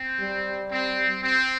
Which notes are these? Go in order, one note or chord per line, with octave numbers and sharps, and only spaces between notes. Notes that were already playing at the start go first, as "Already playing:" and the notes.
Already playing: C4
G3
C4
C4